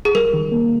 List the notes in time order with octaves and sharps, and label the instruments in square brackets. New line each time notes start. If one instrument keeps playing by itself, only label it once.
[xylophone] G#4
[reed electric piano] G3 [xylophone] A#4
[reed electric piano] D#3
A#3